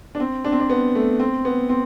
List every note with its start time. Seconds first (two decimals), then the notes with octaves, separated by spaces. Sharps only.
0.15 D4
0.20 C4
0.45 D4
0.52 C4
0.60 D4
0.70 B3
0.95 A3
1.19 C4
1.45 B3
1.69 C4